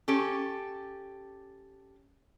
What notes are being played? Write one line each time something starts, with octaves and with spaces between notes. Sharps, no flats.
C#4 G4 A4